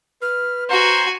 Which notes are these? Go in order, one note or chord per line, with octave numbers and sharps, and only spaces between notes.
B4 F6
F#4 C5 G#5 A#5